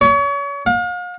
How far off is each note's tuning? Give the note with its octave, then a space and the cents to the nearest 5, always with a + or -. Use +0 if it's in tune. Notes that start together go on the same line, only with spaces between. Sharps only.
C#5 +35
F5 +40